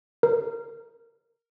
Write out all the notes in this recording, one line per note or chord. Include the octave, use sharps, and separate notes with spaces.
A#4